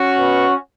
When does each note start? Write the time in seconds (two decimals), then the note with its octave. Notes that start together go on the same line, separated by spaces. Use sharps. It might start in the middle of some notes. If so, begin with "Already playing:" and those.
Already playing: C#4 F#4
0.15 B2 B3